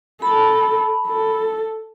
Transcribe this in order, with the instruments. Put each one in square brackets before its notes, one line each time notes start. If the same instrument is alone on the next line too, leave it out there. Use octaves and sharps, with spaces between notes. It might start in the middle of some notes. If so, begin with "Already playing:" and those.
[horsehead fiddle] A4 [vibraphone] A5 B5
[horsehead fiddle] A4